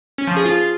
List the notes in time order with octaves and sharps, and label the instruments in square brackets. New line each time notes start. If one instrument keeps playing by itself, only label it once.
[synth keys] C#4
F3
G#4
F4